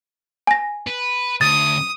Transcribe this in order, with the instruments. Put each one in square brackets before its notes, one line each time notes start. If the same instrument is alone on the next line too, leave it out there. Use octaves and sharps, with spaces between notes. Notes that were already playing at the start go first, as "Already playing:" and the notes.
[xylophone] G#5 A#6
[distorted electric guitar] B4
[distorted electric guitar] D2 [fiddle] D#6 [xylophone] A6